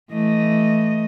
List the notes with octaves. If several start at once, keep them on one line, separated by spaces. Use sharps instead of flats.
E3 A3 D#5